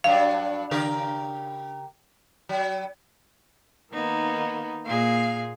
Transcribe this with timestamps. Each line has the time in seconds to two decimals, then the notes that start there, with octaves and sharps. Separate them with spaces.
0.04 G2 F#3 D4 F5
0.71 C#3 G4 A#4
2.49 F#3
3.92 D#3 A#3 B3 D#4
4.86 A#2 A#3 G#4 F5